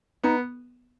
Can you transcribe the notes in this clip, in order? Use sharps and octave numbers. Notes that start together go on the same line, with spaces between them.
B3 D#4